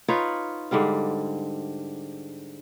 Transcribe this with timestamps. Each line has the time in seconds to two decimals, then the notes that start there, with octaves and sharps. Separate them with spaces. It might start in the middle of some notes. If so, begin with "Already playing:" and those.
0.08 D#4 F4 B4 C#5
0.71 G#2 D3 G3 F5